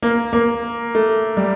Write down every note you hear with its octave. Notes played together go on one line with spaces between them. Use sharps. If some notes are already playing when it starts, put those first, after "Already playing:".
A#3
A#3
A3
G3